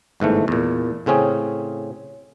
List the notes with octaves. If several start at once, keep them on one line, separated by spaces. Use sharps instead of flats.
G1 G#2 E3 A3
E2 A#2
A2 C#3 C4 C#4 G#4